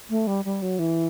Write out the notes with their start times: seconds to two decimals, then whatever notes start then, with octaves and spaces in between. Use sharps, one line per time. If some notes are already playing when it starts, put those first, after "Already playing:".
0.10 A3
0.27 G3
0.45 G3
0.62 F#3
0.79 E3